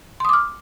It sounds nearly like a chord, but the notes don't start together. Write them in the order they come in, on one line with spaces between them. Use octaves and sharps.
C6 D#6 D6 F6